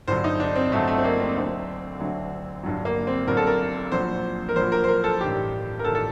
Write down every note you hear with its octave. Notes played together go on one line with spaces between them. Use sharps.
G1 G2 D3 F#3 C5
D#4
D4
C4
G1 G2 D3 F#3 A3
A3
C4
A#3
C4
D2 D3 F#3
D2 D3 F#3
G1 G2 D3 F#3
A#3
C4
G1 G2 D3 F#3 A#4
A4
A#4
A#1 A#2 F#3 C5
A#4
A#1 A#2 F#3 C5
A#4
C5
A#4
A4
A1 G2 D#3 G4
A#4
A1 G2 D#3 A4
A4